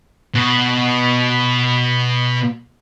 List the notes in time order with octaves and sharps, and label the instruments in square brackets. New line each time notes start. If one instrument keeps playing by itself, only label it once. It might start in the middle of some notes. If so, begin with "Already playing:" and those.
[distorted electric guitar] B2 F#4